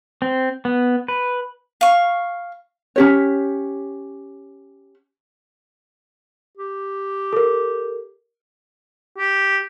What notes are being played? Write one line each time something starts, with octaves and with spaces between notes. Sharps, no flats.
C4
B3
B4
F5 C#6
C#4 G4 C#5
G4
A4 A#4
G4